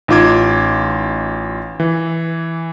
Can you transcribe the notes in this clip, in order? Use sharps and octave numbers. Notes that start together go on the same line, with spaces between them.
A1 D#4 F4 D6 G#6
E3